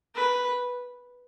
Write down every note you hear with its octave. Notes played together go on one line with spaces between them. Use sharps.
B4